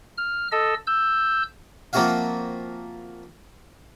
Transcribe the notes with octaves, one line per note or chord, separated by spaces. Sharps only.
F6
A4 D#5 E6
E6 G6
F3 A#3 C4 F#4 E5 F5